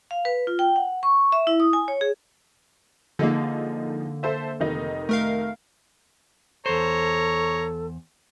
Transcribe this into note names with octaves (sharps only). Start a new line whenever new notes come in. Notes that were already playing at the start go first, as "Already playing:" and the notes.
F5
B4
F4
G5
F#5
C#6
E5
E4
D#6
G#5
C#5
G#4
D3 F3 G#3 A#3 D#4
A4 C5 E5
F1 D#3 D#4
A3 A#4 F5
E2 A4 C5 C#5 A#5